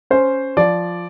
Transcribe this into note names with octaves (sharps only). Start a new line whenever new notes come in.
C#4 C5
F3 D5